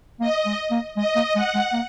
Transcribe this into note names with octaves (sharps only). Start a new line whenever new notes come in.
A#3 D#5
G#3
A#3
G#3 D#5
A#3
G#3 F#5
G#3
A#3